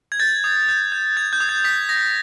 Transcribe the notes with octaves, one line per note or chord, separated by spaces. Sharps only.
G#6
G6 A6
D#6
G6
G6
G6 G#6
G6
D#6
G#6
D#6 B6
D#6 A#6